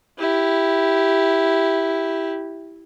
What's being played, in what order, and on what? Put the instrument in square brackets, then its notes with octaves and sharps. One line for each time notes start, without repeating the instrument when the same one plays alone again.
[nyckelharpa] E4 G4